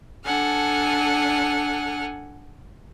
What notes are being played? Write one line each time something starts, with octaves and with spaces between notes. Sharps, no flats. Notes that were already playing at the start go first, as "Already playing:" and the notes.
D4 A4 F#5 G#5 F6